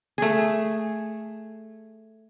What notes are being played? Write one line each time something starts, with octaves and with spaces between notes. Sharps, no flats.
A3 G#4